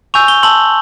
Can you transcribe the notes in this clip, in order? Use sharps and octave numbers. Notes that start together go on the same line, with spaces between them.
G#5 C#6 E6 G6 F7
G7
A5 C6 E6 F#7